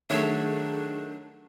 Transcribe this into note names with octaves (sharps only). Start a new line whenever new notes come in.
D#3 F#3 A3 D4 G#4 A4 C#5 E5